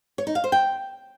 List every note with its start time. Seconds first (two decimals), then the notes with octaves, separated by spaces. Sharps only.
0.18 C#5
0.27 D#4
0.35 F5
0.44 C5
0.52 G5